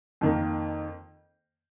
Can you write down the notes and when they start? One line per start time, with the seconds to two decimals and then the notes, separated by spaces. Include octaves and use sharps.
0.21 F2 D#3 A#3